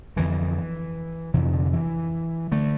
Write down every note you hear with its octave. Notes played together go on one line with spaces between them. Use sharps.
F2 D3 E3
F2 C3 E3
D3
E3
D3 A3